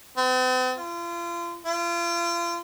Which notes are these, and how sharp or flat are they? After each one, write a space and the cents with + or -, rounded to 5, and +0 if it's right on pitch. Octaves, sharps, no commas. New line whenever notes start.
C4 -45
F4 -35
F4 -35